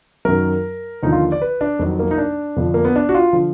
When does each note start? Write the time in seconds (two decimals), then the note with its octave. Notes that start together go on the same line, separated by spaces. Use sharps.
0.25 F#2 D#3 F#3 A#4
1.03 D#2 D3 F3 D#4
1.12 F4
1.32 D5
1.42 B4
1.61 D4
1.79 F2 D#3 F#3
1.99 A#3
2.11 D#4
2.18 D4
2.56 F2 D3 F3
2.74 A#3
2.85 B3
2.96 D4
3.09 F#4
3.14 F4
3.33 D3 F3